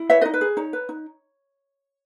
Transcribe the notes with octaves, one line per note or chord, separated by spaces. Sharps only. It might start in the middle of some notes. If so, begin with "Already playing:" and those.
Already playing: E4
B4 C#5 E5
D#4 B4 D#5
B4
G#4
D#4 C#5
B4
D#4